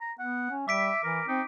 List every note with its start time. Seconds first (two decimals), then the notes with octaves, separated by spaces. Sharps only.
0.01 A#5
0.19 B3 F#5
0.50 C#4
0.68 G3 E5 D6 B6 D7
1.04 E3 A#4
1.28 C4 D#4